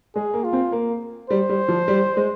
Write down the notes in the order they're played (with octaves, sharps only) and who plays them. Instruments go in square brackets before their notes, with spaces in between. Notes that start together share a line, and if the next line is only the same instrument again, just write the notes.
[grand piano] G#3 [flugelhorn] G#4
[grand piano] A#3
[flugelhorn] F4
[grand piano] C4
A#3
[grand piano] G3 [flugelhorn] C5
[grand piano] G3
F3
G3
G#3